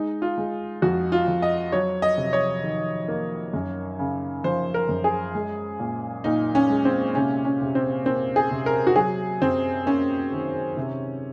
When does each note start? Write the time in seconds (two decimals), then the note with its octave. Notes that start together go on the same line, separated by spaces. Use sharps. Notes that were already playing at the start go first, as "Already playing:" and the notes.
Already playing: G#3 D#4
0.22 F4
0.38 G#3
0.82 F2 F#4
1.12 F4
1.28 F2
1.42 D#5
1.72 F#3 C#5
2.02 D#5
2.18 C3
2.33 C#5
2.63 D#3
3.08 A#3
3.53 F#2
3.99 C#3
4.44 F3 C5
4.74 A#4
4.89 F#2
5.04 G#4
5.35 G#3
5.80 A#2
6.24 A#2 D#4
6.55 C#4
6.69 G#3
6.85 C4
7.15 C3 C#4
7.45 C#4
7.61 C3
7.75 C4
8.05 A#3 C4
8.36 G#4
8.51 C3
8.66 A#4
8.87 F#4
8.96 F#3 G#4
9.42 F#2 C4
9.86 A#3 C#4
10.32 D#3
10.77 C3